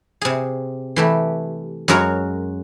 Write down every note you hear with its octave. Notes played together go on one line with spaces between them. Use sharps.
C3 G#4
E3 A3 G4
F#2 G#3 F#4 A#4 C#5 A#5